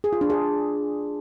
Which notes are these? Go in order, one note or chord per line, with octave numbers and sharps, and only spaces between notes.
G#4
F4
D4
G#4